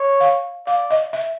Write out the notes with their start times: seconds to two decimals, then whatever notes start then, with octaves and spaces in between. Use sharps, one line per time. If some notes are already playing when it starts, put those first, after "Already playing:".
Already playing: C#5
0.20 F5
0.67 D5 F5
0.91 D#5
1.13 E5